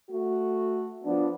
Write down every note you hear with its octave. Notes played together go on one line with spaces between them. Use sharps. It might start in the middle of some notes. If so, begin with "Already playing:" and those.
A3 F#4
F3 B3 D4